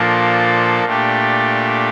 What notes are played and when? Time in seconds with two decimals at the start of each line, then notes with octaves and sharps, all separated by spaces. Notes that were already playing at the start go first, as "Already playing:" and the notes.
Already playing: A#2 F3 A#3 D4 A4
0.84 A#2 A3 D4 G4